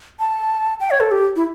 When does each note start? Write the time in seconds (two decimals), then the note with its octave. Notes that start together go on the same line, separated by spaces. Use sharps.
0.19 A5
0.80 G5
0.91 C#5
1.00 A4
1.11 G4
1.36 E4